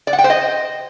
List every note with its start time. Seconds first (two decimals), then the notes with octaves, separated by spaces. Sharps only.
0.07 D5
0.13 F#5
0.19 G5
0.24 C5
0.30 D#5